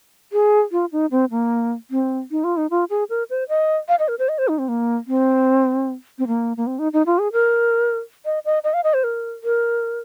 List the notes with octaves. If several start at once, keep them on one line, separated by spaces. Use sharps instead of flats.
G#4
F4
D#4
C4
A#3
C4
D#4
F4
D#4
F4
G#4
A#4
C5
D#5
F5
D#5
A#4
C5
D#5
C5
D#4
C4
A#3
C4
C4
A#3
A#3
C4
D#4
D#4
F4
G#4
A#4
D#5
D#5
D#5
F5
D#5
C5
A#4
A#4